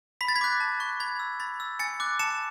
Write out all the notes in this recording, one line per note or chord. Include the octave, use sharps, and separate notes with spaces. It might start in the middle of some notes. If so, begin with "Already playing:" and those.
B5 B6
A6
G#6 B6
D6 F#6
A5
C#6 F#6
B5 G#6
E6
B5 A6
E6
G#5 A6 C#7
D6 F#6
A5 C#7 E7